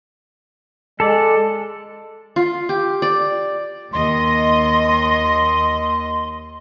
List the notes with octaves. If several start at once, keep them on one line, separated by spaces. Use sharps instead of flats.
G#3 A4 D5
F4
G4
D5
D#2 D#5 C6